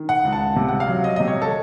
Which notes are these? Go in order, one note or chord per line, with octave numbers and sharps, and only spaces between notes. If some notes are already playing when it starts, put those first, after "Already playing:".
Already playing: D#3
F#5
C#2
A5
C3
F#5
F5
F#3
D#5
C3 D#5
C#5
A4